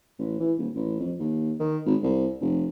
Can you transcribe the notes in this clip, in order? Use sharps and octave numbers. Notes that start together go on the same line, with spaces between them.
A1
E3
D#1
A1
F2
D#2
D#3
G#1
C2
F1